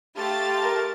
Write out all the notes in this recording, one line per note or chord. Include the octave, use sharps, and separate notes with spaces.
A3 G4 F5 G5 A5 C6 A6
A#4